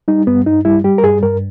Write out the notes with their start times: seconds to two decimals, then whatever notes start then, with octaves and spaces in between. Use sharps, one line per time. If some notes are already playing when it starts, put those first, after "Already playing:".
0.08 G3 D#4
0.27 G2 B3
0.46 G2 D#4
0.65 G3 E4
0.84 G3 G4
0.98 A#4
1.04 G2 G#4
1.23 G2 A#4